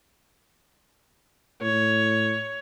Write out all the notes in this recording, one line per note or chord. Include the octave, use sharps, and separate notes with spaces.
A2 C#5